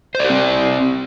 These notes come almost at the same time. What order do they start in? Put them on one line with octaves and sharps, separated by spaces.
C5 D5 G4 C4